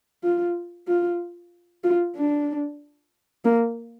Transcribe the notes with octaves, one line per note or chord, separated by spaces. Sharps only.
F4
F4
F4
D4
A#3